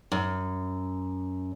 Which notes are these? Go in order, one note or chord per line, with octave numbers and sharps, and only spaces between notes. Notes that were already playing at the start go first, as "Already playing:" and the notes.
F#2